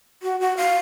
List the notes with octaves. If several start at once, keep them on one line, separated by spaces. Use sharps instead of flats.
F#4
F#4
F5